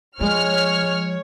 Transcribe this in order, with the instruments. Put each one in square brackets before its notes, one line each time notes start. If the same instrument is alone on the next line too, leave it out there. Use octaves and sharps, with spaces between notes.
[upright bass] F3 [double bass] G#3 [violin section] C#5 [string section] F6